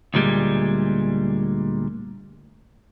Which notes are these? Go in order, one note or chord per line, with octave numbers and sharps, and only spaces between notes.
D2 A#2 G3 G#3